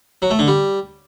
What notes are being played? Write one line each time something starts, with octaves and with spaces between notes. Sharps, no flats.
F#3
A3
D3
G3